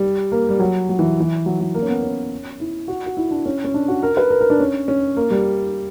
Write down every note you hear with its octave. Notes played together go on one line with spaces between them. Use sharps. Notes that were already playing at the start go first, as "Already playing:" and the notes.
Already playing: G3
A#3
G3
F#3
F#3
E3
E3
F#3
F#3
A#3
C#4
B3
C#4
E4
F#4
F#4
E4
D4
C#4
C#4
D4
F#4
A#4
B4
A#4
A#4
D4
C#4
C#4
A#3
G3